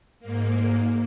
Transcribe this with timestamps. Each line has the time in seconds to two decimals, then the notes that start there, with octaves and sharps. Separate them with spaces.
0.20 G#2 A#3